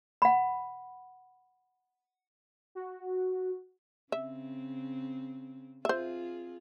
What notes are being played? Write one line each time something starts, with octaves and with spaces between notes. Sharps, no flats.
F#5 B5
F#4
C#3 C4 E5
C4 F4 G#4 C5 E5